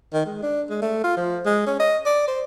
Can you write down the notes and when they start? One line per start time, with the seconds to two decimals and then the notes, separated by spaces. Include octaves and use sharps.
0.13 D#3
0.26 G#3
0.43 D4
0.70 G#3
0.82 A3
1.04 F4
1.17 F3
1.46 G#3
1.66 C#4
1.79 D#5
2.05 D5
2.28 C5